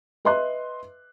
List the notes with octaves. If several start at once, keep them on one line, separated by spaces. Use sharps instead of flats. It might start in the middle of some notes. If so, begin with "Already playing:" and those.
B4 D#5 E5 C6 F#6